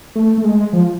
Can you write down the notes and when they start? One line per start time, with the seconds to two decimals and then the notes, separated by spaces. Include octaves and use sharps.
0.15 A3
0.38 A3
0.44 G#3
0.73 F3